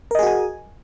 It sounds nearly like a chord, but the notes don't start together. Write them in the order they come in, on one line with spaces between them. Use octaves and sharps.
A#4 D#5 G#4 F#4 G#5